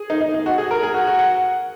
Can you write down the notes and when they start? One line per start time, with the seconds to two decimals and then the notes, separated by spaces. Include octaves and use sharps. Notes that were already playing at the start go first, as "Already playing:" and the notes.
Already playing: G#4
0.10 D#4
0.21 D#4
0.34 D#4
0.46 F#4
0.58 G#4
0.71 A#4
0.83 G#4
0.94 F#4
1.07 F#4
1.18 F#5